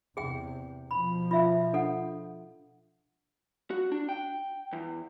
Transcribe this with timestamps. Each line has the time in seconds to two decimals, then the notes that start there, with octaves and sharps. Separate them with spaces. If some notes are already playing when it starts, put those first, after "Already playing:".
0.17 E2 C3 G#4 G5
0.91 B2 F3 B5
1.31 F4 E5 F5
1.73 D4 A4 F#5
3.70 F#4
3.92 D4
4.09 G5
4.73 E2